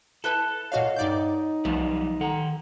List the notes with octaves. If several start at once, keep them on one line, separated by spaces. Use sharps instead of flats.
E4 A4 B4 A5 F#6 G7
A#2 F#4 C#5 D#5 F5 F#5
G2 D#4 D5 G6
B1 F3 G3 A3 B3 B4
D#3 A4 F#5 A#5